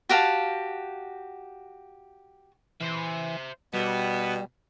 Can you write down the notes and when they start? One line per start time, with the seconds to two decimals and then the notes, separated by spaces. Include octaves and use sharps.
0.09 F#4 G4 F5 A5
2.81 E3 C5 E5
3.74 B2 G3 B3